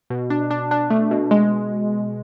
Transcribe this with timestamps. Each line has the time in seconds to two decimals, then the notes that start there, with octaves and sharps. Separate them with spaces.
0.10 B2
0.30 D4
0.51 D4
0.71 D4
0.90 A3
1.11 B2
1.31 G#3